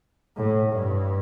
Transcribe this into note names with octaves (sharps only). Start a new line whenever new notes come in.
A2
G2